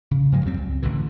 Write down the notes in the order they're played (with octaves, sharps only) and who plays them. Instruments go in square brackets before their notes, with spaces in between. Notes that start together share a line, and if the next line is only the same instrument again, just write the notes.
[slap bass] C#3
G2 F3 F#3 G#3
F2 F#3 G3 C4
C#2
A1 B2 D3 E3